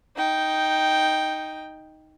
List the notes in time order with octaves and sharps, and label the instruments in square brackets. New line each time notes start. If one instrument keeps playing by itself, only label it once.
[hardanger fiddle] D#4 G5